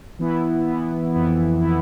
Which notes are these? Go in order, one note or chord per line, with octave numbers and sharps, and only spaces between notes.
E3 B3 E4
E3 B3 E4
F2 E3 B3 E4
E3 B3 E4